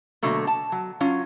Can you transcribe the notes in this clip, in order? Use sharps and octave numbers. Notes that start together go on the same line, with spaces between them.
B2 D3 F#3 A3 A#3
A5
F#3
F#3 C#4 F4